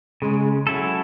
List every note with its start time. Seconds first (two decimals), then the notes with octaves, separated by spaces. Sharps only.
0.22 C#3 G#3
0.67 F#3 C#4 E4 A4